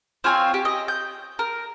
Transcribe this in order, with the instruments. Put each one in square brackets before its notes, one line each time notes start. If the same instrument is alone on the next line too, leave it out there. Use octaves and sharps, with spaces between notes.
[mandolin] C4 F4 C#5 G#5
G4
D#5
G6
A#4